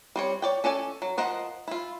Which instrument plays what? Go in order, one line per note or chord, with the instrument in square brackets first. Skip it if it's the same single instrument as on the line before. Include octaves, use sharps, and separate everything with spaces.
[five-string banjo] G3 C4 C#5
C#5 D5 G5
C#4 A4 D5 G#5
F#3
F3 A#4 C5 D#5 F#5
E4 F4